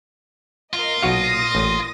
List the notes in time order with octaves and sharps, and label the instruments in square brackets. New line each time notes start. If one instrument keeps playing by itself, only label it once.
[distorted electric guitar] F4 [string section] A#4 D#5
[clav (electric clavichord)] B1 F#4 F5 [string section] A#2 D#6 A#6
[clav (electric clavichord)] A1